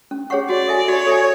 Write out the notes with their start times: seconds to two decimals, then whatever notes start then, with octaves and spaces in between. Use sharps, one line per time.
0.11 C#4
0.30 G#4 C#5 F#5 C#6
0.49 F#4 D5
0.68 A4 E5 G#5
0.88 F#4 C#5
1.07 A4 E5 G#5